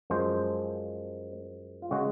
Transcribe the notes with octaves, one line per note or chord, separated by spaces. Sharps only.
F#2 F3 G#3 C5
F4
C#3 G#3 F#4